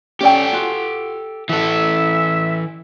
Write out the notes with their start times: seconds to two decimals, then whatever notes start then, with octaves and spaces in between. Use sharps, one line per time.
0.21 C#4 G4 A4 D5 G5
0.53 F4 F#4
1.49 E3 F#4 A4 E5